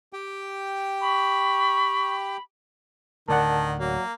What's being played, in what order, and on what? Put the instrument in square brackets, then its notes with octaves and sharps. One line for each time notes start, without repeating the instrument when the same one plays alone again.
[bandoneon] G4 G5
[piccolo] B5 [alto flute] C#6
[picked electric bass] D1 D3 A3 [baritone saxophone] D#3 [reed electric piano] A#4 D5 F#5 [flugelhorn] A5
[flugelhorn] F#3 [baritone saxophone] A#3